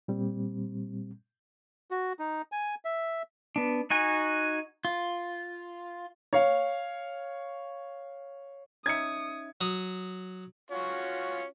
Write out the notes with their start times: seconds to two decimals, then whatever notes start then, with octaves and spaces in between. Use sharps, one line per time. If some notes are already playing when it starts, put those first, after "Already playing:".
0.08 A#2 G3 C4
1.91 F#4
2.19 D#4
2.52 G#5
2.85 E5
3.56 B3 D4
3.90 D#4 F#4 G#5
4.85 F4
6.33 C#5 F5
8.86 C#4 D#4 E5 D#6 G#6 C#7
9.61 F#3 D#6
10.71 C#4 F4 F#4